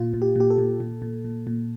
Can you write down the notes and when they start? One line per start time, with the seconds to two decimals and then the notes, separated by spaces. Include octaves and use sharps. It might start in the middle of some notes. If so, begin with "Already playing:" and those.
Already playing: A#2 F4
0.13 A#2
0.22 G4
0.36 A#2 G4
0.50 A4
0.58 A#2
0.80 A#2
1.02 A#2
1.24 A#2
1.47 A#2